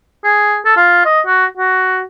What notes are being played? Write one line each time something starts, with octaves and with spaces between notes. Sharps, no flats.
G#4
A4
F4
D#5
F#4
F#4